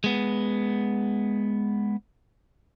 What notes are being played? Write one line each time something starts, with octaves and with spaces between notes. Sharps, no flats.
G#3 B3